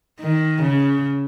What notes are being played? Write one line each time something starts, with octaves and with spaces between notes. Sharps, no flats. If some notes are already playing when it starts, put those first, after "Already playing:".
D#3
C#3